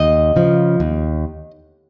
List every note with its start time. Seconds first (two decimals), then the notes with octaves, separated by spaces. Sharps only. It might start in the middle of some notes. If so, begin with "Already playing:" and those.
Already playing: D#2 D#5
0.36 C#3 F3
0.80 D#2